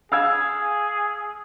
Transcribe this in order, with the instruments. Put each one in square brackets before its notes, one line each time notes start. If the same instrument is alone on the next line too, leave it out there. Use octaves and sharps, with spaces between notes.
[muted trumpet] G#4 [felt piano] F5 E6 G#6